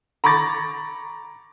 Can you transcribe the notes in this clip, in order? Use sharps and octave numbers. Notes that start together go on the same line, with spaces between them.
A#5 B5 C#6 D6 A6 A#6